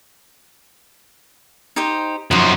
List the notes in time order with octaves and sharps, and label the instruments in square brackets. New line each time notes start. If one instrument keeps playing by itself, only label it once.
[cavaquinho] D#4 G4 C5
[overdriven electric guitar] F#2 F3 [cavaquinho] D#4 E5